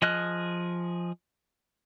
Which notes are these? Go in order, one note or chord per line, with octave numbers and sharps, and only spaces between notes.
F3 G#4 D#5 F6 F#6